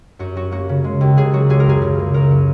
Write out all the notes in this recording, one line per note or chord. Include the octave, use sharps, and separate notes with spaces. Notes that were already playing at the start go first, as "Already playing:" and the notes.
F#2 F#4
F#3 F#4
A#3 F#4
C#3
G#3
D#2
C#3 G#4
F#3 F#4
C#2 G#4
A#4
F#2 G#4
C#3
A#3
F#2 A#4
F#3